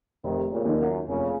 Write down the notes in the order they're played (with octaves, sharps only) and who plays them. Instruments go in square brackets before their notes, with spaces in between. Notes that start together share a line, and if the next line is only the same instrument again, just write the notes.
[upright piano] F1 [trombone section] C3 D#3
[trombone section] A#2 C#3
[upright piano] D#2 D#3
[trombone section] F#2
[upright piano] F1 [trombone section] A#2 C#3